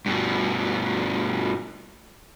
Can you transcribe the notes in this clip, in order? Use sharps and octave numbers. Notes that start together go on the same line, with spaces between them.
G2 B2